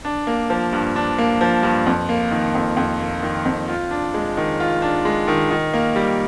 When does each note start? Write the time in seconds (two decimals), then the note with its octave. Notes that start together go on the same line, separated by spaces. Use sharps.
0.05 D4
0.27 A#3
0.50 F3
0.73 G2
0.96 D4
1.18 A#3
1.41 F3
1.63 G2
1.86 F2
2.09 A#3
2.31 D#3
2.55 F2
2.77 F2
3.00 A#3
3.22 D#3
3.45 F2
3.68 F4
3.91 D4
4.14 G#3
4.37 D#3
4.60 F4
4.82 D4
5.05 G#3
5.28 D#3
5.51 D#3
5.74 A#3
5.96 G3